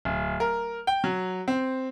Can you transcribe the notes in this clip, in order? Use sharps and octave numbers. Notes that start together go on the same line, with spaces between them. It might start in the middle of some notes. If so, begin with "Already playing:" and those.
D1
A#4
G5
F#3
C4